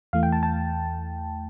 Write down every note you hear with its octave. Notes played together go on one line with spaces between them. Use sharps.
E2 E3 A3 F5
G5
A5
A5